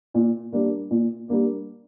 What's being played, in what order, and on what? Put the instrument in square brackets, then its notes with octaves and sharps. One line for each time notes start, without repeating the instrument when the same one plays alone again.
[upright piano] A#2
G3 A#3 D4
A#2
G3 A#3 D4